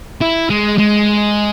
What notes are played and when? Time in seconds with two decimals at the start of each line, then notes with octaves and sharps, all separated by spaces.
0.21 E4
0.50 G#3
0.78 G#3